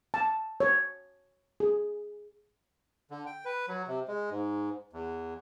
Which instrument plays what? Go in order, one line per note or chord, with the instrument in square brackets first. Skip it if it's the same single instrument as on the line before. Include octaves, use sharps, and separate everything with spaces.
[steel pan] A5
C#5
G#4
[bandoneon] D3
G5
B4
F#3
C3
G#3
G#2
E2